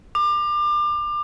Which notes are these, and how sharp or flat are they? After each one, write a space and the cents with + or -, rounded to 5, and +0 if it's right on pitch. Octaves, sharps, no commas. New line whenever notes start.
D6 +30